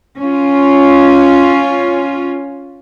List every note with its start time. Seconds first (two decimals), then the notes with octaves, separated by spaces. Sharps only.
0.20 C#4 F4